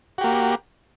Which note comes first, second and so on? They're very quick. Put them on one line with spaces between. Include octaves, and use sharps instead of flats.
F#4 G4 A#3